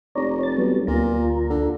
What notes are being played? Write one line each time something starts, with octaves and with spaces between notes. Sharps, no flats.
F1 C#5 D5 A#5
A6
F#3 G3 B3
D2 A#2 F4 A#5
D3